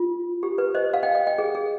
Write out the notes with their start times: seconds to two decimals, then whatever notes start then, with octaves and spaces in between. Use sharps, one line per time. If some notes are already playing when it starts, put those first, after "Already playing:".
Already playing: F4
0.43 G4
0.58 B4
0.75 C5 D#5
0.94 F5
1.03 D#5 G5
1.15 D#5 G5
1.27 D#5 G5
1.38 G#4
1.55 G#4